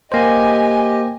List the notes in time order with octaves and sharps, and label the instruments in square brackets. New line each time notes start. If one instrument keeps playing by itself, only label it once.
[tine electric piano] A#3 C5 [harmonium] G4 D#5 [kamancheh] G#5